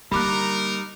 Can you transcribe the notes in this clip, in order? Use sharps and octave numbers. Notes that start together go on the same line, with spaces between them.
D3 G3 A#3 D#4 A#4 B5 D6 F#6